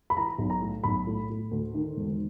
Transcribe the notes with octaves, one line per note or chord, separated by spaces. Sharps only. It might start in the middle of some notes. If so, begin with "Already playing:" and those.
B5
E3 A#5
B1
A#5
A2
B1 B5
A2
A2
D2
D#3
E1